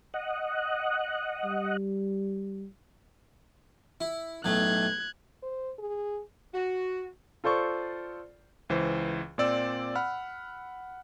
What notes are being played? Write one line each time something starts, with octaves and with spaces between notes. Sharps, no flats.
D#5 F#5
G3
E4
B1 A2 A3 F#6 G#6
C5
G#4
F#4
F4 A4 C5 D5 C#6
C#2 E3 C5
A#2 C4 D5 E6
F#5 B5 F6